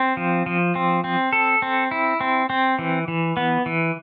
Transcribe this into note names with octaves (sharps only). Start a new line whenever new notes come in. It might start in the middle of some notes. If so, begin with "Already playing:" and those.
Already playing: C4
F3
F3
C4
C4
A4
C4
E4
C4
C4
E3
E3
B3
E3